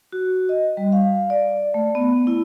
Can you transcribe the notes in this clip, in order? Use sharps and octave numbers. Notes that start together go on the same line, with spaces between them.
F#4
D#5
G3
F5
D5
A3
B3
E4